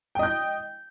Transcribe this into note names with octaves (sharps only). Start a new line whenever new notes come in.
D#5 G5 G6